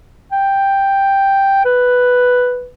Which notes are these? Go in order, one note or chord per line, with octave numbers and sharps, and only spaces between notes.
G5
B4